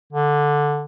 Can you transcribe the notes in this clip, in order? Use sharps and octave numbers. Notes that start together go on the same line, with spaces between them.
D3